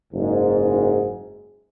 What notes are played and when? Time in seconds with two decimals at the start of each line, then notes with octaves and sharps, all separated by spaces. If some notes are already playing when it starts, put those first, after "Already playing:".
0.13 F#1 G#2